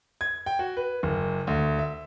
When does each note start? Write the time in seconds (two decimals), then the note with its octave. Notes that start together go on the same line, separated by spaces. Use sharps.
0.21 G#6
0.46 G5
0.59 F#4
0.77 B4
1.03 F#1
1.47 D2
1.79 E5